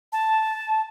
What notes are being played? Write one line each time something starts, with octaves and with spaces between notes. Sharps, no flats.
A5